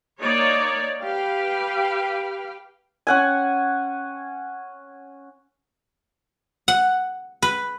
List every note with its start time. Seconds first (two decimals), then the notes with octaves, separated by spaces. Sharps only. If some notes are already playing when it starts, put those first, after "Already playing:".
0.21 A#3 D#4 C#5 D5
1.04 G4 B4 F5 G5
3.07 C#4 F#5 G#5
6.68 F#5
7.42 B4